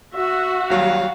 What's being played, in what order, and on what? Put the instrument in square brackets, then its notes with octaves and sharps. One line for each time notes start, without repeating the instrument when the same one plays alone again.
[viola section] F#4 [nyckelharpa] E5
[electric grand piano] D#2 F#3 G3 [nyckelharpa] F5